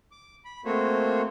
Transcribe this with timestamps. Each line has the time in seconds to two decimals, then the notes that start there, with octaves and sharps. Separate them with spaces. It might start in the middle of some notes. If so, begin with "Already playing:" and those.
0.11 D6
0.45 B5
0.65 A3 A#3 C4 F#4 C5 C#5